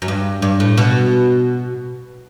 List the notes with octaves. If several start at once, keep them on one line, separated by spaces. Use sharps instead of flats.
F#2
G2
G2
A2
B2